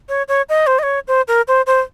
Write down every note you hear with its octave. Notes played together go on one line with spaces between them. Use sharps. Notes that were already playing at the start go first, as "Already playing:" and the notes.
C#5
C#5
D#5
C5
D#5
C#5
C5
A#4
C5
C5